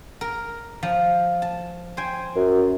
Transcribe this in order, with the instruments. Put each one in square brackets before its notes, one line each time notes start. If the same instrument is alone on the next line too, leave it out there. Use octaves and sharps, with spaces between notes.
[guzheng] A#4
F3
A5
C5 G5 G#5
[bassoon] F#2